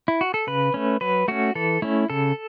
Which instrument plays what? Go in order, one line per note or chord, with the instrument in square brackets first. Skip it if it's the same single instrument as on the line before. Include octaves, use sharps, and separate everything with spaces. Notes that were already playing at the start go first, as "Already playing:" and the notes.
[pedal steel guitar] E4
F#4
A4
C#3 B4
A3 C#4
F#3 B4
A3 C#4 F#4
E3 A4
A3 C#4 E4
C#3 A4